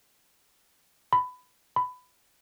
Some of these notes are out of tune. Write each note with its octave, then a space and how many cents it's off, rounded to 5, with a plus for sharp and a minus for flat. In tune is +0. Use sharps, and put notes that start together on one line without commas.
B5 +20
B5 +20